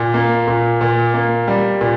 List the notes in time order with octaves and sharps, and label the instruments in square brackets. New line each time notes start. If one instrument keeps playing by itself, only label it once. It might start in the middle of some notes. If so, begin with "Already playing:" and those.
Already playing: [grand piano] A#2
A#3
A#2
A#2
A#3
G3
A#2